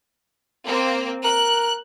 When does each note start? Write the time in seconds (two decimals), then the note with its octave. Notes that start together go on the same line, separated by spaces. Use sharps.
0.66 A#3 C4
1.24 A#4 F#6